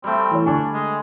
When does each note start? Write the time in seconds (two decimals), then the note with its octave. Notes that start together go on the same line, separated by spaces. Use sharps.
0.04 G3 A3 C4
0.31 E3 C#5
0.46 D3 D4 G#5 C#6
0.73 G#3